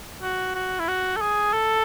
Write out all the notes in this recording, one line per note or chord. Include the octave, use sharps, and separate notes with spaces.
F#4
F#4
E4
F#4
A4
G#4
A4